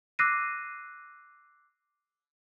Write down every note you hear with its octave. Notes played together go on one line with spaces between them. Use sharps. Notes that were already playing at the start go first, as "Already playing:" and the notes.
D6 E6 F#6 A#6 C7 D#7